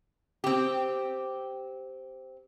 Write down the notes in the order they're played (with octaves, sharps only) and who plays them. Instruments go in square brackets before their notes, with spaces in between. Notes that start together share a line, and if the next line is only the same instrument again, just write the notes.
[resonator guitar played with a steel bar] C4 G4